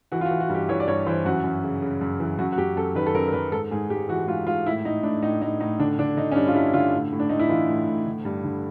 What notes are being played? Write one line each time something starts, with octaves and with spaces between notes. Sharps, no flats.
E3 F#4
F4
F#4
E3
F#4
G2
G4
E3 C#5
D5
G2 C#5
E3 C5
F#2 F#4
F#2
C#3
C#3
F#2
E3
F#2 F#4
F#4
F#2 G4
F#2 A4
D#3 B4
A4
F#2 A#4
A#4
F#2 B4
G#2 A4
G#2 G#4
G#2 G4
E3 F#4
G#2 F4
G#2 F4
A2 E4
A2 D#4
A2 D4
A2 D#4
A2 D#4
A2 D#4
D3 D4
D3 D4
D3 D#4
C#4
G2 D4
F4
G2 E4
D3 F4
A2
A2
D4
A2 D#4
E4
E3 F4
A2
A2
D3
G2
D3